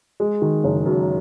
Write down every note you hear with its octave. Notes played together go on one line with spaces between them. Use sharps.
G#3
D#3
F#1
F#2